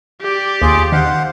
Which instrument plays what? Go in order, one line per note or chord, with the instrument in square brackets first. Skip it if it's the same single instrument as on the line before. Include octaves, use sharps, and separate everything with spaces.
[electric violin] G4 D5
[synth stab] D#2 [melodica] F4 G#4 D6
[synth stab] D#3 [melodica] C5 F5 F#5